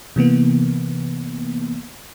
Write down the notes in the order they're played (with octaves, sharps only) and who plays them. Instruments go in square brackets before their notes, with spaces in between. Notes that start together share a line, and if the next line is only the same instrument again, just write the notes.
[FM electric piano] C3 E3 A#3 B3